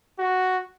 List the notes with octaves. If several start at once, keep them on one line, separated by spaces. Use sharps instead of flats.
F#4